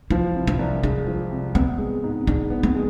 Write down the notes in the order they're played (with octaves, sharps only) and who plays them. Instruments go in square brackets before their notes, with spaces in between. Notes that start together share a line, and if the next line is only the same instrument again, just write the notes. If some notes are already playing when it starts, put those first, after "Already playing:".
[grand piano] F3 [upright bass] E4
[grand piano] C3
[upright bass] D4
[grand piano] C2
[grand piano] G#3 [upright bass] D4
[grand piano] F3
C3
[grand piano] B3 [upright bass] C4
[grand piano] G#3
G#2
[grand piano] G#2 [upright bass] D4
[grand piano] B3
[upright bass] C4
[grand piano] G#3